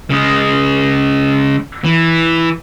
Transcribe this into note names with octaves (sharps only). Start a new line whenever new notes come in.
C#3 G#3
E3